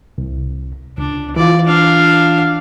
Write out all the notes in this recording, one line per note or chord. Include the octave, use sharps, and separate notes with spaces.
C2
C#2 D4
E3 F4 D5
D4 F5